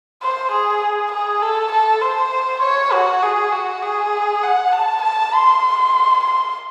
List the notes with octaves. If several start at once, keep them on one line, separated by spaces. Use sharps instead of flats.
C5
G#4
G#4
A4
A4
C5
C#5
F#4
G#4
F#4
G#4
F#5
A5
A5
C6
C6